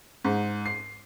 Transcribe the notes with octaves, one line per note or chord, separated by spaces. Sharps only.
G#2
C7